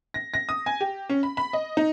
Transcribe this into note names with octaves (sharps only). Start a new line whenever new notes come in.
A#6
A#6
D#6
G#5
G4
C#4
B5
B5
D#5
D#4